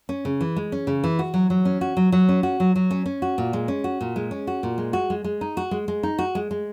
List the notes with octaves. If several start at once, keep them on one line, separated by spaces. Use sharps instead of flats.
C#4
C#3
E3
G#3
C#4
C#3
E3
F#4
F#3
F#3
C#4
F#4
F#3
F#3
C#4
F#4
F#3
F#3
C#4
C#4
F#4
A#2
G#3
C#4
F#4
A#2
G#3
C#4
F#4
A#2
G#3
F#4
G#3
G#3
D#4
F#4
G#3
G#3
D#4
F#4
G#3
G#3